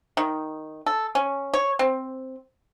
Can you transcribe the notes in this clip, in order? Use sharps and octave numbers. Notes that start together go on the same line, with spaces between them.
D#3
A4
C#4
C#5
C4